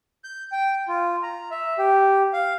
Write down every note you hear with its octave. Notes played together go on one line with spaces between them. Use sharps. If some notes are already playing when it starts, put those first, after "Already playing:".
G6
G5
F4
A#5
E5
G4
F5